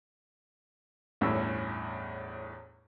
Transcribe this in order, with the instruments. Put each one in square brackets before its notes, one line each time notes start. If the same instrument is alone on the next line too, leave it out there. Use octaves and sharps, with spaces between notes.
[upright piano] G1 E2 A2 C#4 E6